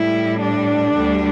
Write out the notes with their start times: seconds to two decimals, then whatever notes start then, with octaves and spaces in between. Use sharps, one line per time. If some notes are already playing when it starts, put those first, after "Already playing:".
Already playing: A2 G3 E4
0.42 D4
0.95 D2 D3 G3